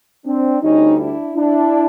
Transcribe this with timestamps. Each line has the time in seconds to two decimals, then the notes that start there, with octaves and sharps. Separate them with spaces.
0.25 C4 D4
0.62 D2 D3 G3 C#4 D#4
0.99 D4 E4
1.36 D4 E4